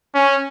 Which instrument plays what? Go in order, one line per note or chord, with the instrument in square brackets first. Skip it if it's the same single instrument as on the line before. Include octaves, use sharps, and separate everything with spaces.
[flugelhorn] C#4